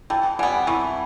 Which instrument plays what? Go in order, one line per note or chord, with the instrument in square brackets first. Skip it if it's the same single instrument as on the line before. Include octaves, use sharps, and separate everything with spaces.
[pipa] E3 [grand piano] G5 A5
[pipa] G3 B3 [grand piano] F#5 G#5
[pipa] E3 [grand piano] B5 C#6